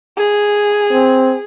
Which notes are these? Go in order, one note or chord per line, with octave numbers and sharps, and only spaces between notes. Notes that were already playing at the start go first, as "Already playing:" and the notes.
G#4
C4